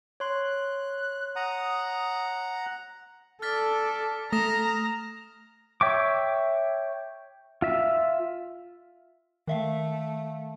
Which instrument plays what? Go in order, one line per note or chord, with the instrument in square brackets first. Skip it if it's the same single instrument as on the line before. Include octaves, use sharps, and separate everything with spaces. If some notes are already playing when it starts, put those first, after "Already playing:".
[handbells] C#5 C6 [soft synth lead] F#6
[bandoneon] F#5 A#5 [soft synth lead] D#6
[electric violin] A4 D5 [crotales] F6 A6 B6
[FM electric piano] A3 [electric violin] A#5 [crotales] D#6 A#6 E7
[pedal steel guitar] C#5 E5 G5 C#6 D6
F4 E5
[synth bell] D#3 E5 F5 [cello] A3